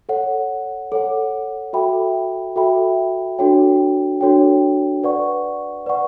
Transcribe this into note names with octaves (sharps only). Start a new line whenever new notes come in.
A4 C#5 F#5
A4 C#5 F#5
F#4 A4 E5 G5 B5
F#4 A4 E5 G5 B5
D4 F#4 A4 C#5 G5
D4 F#4 A4 C#5 G5
B4 D5 F#5 C#6
B4 D5 F#5 C#6